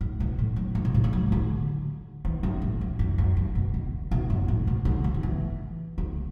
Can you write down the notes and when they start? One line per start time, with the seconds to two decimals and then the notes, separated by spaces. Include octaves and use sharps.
0.01 A2
0.20 B2
0.39 A2
0.56 F#3
0.75 D3
0.85 B2
0.94 A2
1.04 A3
1.13 F#3
1.32 D3
2.25 E3
2.43 F#2
2.62 A2
2.81 F#2
2.99 F#2
3.18 F#2
3.37 F#2
3.55 B2
3.74 D3
4.11 B2
4.30 F#2
4.48 A2
4.67 B2
4.85 D3
5.04 E3
5.14 F#3
5.23 E3
5.98 D3